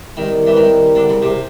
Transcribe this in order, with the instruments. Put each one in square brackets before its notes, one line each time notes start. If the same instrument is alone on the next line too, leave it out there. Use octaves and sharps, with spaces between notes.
[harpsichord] D#3 [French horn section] G3 C4 E4 G4 A#4
[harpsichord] E3
D#3
D3
C#3
C3